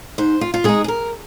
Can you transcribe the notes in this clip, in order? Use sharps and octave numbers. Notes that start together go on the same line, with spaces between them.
G#2 C5
F4
F4
G#3 D#4 G#4
G#4
A#4